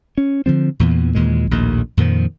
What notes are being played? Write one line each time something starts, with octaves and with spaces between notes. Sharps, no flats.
C#4
D3 F3 C4
E2 A#2 E3 B3
D#2 A#2 E3 G#3
A#1 D#2 A2 D#3
F2 A#2 D#3 F3